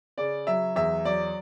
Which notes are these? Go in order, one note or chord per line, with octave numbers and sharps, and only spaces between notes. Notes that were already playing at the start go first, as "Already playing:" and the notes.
C#3 D5
F#3 E5
E2 E5
F#3 D5